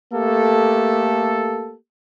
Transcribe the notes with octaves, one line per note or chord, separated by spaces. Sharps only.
A3 A#3 G4 A4